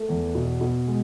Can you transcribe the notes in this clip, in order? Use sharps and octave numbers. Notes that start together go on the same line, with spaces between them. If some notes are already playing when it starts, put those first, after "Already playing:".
Already playing: A3
E2
B2
B2
G#3